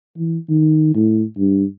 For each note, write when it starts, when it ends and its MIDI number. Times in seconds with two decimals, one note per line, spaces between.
0.18 0.38 52
0.49 0.95 51
0.95 1.23 45
1.38 1.64 43